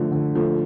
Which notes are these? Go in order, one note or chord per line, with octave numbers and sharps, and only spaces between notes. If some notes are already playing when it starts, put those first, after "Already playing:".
Already playing: D3 F3 A3
D3
F3 A3